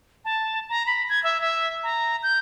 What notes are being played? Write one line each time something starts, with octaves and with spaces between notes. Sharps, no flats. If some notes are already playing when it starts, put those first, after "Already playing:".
A5
A#5
B5
G#6
E5
E5
A#5
G6